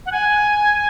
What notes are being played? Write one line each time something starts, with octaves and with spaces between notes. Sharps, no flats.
F#5
G#5